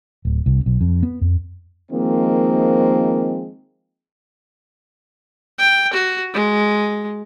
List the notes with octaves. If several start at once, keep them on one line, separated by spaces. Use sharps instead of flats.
D1
C2
B1
F2
B3
F2
D#3 F3 G#3 A#3 C4
G5
F#4
G#3